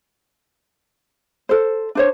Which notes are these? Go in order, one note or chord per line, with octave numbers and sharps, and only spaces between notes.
A4 C5
D4 C5 C#5